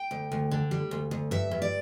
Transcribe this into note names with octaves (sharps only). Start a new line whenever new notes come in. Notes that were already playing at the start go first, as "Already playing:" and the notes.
Already playing: G5
D2
D2
D3
G3
D2
D2
G2 E5
G2
D5